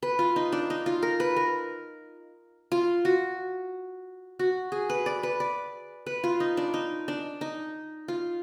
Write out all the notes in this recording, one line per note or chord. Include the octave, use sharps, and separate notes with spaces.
B4
F4
D#4
D4
D#4
F4
A#4
B4
A#4
F4
F#4
F#4
G#4
B4
D5
B4
D5
B4
F4
D#4
D4
D#4
D4
D#4
F4